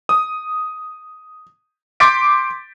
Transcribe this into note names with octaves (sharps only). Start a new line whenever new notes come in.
D#6
C6 D6 G6 A6 B6 D7